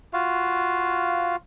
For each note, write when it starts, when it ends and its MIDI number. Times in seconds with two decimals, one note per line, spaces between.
0.13 1.36 65
0.13 1.36 66
0.13 1.36 77